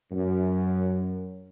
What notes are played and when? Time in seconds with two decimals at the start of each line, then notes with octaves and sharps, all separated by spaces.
0.12 F#2